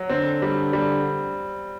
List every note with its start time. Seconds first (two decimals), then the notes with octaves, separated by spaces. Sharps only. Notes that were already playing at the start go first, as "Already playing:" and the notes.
Already playing: F#3
0.10 D3 C4
0.42 G3
0.73 G3